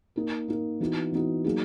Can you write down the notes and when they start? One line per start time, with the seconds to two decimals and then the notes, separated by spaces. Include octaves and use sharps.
0.16 A#3 D#4 A#4
0.48 A#3 D#4 A#4
0.80 E3 B3 D#4 F#4
1.12 E3 B3 D#4 F#4
1.44 F#3 A#3 D#4 G#4